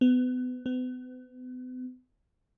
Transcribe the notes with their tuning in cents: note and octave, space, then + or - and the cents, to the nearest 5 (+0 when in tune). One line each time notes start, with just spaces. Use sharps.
B3 +30
B3 +40